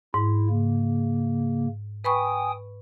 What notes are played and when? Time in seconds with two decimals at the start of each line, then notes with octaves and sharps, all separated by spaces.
0.14 G#2 E4
0.50 C#3 A#3
2.04 B4 G5 G#5 B5 C#6 D#6